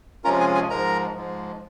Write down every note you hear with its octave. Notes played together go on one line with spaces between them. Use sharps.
C3 F3 G#3 C#4 F4 A#4 A#5
G#4 G#5
G#4 G#5
G#2 F3 G#3 A#4 A#5
G#2 F3 G#3